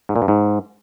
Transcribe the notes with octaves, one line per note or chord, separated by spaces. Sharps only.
G#2
A#2
G2
G#2